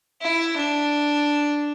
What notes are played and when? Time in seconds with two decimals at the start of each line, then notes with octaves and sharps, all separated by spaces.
0.21 E4
0.56 D4